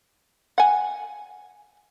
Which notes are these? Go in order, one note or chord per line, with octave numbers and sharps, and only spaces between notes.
F#5 G#5